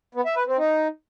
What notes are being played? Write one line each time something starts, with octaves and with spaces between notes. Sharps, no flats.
B3
E5
B4
C4
D#4